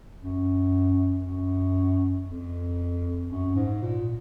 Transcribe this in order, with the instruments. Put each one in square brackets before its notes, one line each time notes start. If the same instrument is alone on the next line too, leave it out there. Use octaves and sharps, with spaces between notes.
[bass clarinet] F#2
F#2
F2
F#2
G#2
A#2